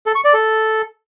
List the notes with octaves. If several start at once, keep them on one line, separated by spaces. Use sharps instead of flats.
A4
C#6
D5
A4